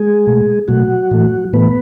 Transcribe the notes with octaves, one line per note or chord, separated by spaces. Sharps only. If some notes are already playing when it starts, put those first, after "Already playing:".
Already playing: G#3 G#4
B2 A3
B2 F#3 A3 F#4
A2 E3 A3
A2 E3 A3 B3 B4